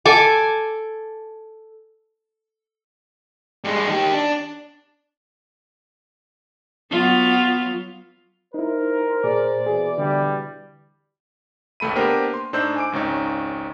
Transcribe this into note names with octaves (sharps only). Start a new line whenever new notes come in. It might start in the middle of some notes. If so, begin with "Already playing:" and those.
A4 G#5 D6
G2 G#3
D#3 G4
D4
F#3 B3 F4
D#4 E4 A#4 C5
A#2 G#4 D5
E2 B2 E3 G#4
D3 G3
G#1 C#2 A3 B5 D#7
A#3 B3 D4 G4 A#4 C5
C6
A2 D4 D#4 C5 E6 G6
G#5 D6 D7
G#1 C#2 C#4 D#4